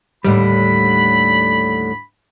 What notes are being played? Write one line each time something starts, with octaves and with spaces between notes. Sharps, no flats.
D#2 A2 D3 G3 B5